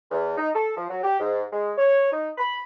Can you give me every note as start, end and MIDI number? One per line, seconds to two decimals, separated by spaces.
0.11 0.35 40
0.38 0.49 63
0.55 0.72 69
0.76 0.85 53
0.89 1.01 54
1.04 1.20 67
1.20 1.44 44
1.53 1.72 56
1.77 2.09 73
2.12 2.30 63
2.38 2.62 83